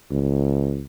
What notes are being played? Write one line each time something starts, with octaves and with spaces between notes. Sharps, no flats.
C#2